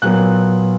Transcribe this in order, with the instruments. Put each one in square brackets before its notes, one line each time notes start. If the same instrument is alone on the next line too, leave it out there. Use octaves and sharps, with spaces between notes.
[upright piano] A#2 F#3 B3 F#6